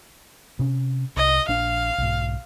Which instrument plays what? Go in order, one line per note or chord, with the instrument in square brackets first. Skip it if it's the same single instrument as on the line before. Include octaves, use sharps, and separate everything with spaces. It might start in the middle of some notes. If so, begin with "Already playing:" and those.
[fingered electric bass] C3 C#4
[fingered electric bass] C2 [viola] D#5
[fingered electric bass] A#1 D4 [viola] F5
[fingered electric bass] B1 G#2